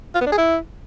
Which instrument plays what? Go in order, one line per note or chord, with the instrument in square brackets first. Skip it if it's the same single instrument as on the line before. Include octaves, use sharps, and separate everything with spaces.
[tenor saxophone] F4
B3
D4
G#4
E4